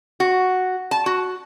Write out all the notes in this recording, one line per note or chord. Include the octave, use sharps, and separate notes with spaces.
F#4
A5
F#4